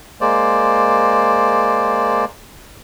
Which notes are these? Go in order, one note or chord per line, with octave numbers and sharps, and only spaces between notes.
G#3 A#3 C5 D5